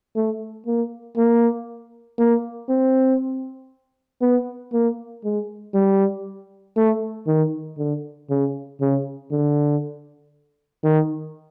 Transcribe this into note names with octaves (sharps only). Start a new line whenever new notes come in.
A3
A#3
A#3
A#3
C4
B3
A#3
G#3
G3
A3
D#3
D3
C#3
C#3
D3
D#3